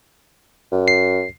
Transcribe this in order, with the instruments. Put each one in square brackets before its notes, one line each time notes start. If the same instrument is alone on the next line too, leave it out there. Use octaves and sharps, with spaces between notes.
[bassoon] F#2
[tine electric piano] C7